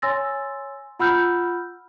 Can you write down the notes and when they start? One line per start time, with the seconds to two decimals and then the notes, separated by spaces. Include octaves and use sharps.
0.02 C#5 G#5 C6 E6 A6 A#6
0.99 F4 F#5 B5 E6 F6 G6